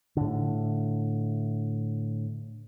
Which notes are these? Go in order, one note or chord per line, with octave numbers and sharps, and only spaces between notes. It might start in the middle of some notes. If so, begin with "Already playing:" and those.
A2 D3